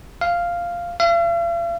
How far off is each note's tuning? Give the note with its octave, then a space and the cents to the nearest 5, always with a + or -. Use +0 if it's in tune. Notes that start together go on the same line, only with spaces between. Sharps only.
F5 -5
F5 -45